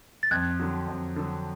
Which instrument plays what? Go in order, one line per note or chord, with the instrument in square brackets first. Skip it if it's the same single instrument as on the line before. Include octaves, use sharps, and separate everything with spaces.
[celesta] A6
[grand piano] F2 [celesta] F#6 G#6
[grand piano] D3 F#3
F2
D3 F#3